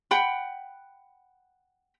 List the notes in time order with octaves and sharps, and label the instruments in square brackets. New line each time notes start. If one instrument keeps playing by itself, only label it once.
[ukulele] F#5 G5 B5